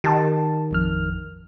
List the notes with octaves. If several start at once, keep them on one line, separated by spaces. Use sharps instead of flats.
D#3 G4 A5
A1 F2 F6